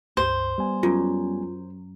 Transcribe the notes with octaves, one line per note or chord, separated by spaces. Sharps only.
C#2 G2 C5
G3 B3 G#5
F#2 F4